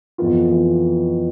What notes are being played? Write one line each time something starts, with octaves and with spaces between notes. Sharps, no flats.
F2 E3 B3 F4
E3 B3 F4